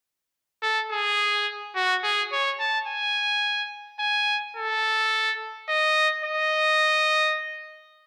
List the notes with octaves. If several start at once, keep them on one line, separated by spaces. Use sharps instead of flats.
A4
G#4
F#4
G#4
C#5
A5
G#5
G#5
A4
D#5
D#5